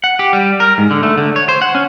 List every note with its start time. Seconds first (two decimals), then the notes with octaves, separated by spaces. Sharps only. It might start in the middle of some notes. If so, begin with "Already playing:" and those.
0.04 F#5
0.19 G4
0.33 G3
0.60 A#4
0.78 G#2
0.91 D3
1.03 A3
1.18 D3
1.36 C#5
1.49 C5
1.62 F#5
1.75 C#4